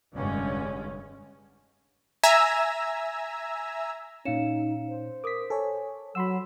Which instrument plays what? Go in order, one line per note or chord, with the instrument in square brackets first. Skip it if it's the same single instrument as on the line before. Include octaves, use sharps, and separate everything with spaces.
[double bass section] F1 G2 D3 G#3 C#4
[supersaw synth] E5 G#5 A#5 E6
[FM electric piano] A#2 C#4 [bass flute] D#4 [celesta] F5 C#7 E7
[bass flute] C5
[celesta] A#4 D#6 [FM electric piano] D6 B6
[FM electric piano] A4 C#5 [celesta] G#5
[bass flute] F#3 [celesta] F#5 E7 [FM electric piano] B5 C6 E6